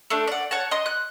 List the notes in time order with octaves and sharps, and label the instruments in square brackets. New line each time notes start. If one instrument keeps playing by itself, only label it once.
[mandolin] A3 D4
D5 F#5
C#5 F#5 A5
D#5 C6 D#6
F#6